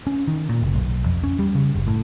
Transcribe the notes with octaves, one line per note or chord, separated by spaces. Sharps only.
C#4
D#3
A#2
F#1
B1
F2
C#4
G3
C#3
F#1
A2